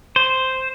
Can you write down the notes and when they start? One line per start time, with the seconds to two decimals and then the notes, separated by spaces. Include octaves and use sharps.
0.16 C5